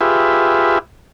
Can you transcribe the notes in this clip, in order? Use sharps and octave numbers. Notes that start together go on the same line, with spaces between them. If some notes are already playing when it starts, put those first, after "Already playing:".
F4 G4 G#4 B4 E5